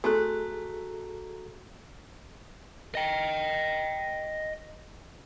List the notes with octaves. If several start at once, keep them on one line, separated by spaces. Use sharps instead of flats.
A3 F#4 G#4 A4 A#5 F#6
D#5 G5